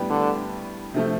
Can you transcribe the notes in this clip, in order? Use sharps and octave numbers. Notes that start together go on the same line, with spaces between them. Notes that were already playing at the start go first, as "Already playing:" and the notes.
Already playing: A2 G3 B3 D4 G4
D3
C3 F3 A3